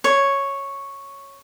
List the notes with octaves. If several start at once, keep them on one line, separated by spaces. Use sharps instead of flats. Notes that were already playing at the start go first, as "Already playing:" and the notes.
C#5